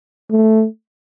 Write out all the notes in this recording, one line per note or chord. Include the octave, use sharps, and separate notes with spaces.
A3